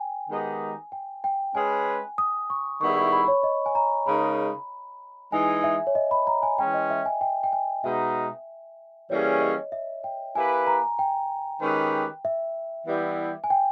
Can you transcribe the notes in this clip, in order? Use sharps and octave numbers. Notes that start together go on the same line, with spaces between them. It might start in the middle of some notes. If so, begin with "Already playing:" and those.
Already playing: G5 G#5
D#3 G#3 B3 D#4 G4
G5
G5
G#3 C#4 G#4 B4 G#5
D#6
C#6
D#3 G3 B3 E4 G#4 C#6
C#6
C#6
B5
C#5
D#5
G#5
A#5
C#3 G#3 D#4 A#4 B5
E3 G#3 D#4 G#4 G#5
E5
C#5
D#5
B5
A#5
G#5
E3 G#3 C#4 G5
D#5
E5
G#5
G5
G5
G#5
B2 G#3 B3 D#4 E5
E3 G3 A#3 C#4 G#4 C#5
D#5
E5
G5
A#3 E4 G4 B4 G#5
A#5
G5
D#3 G#3 C#4 G4 B4
E5
E3 G3 B3 E4 G4
G#5
G5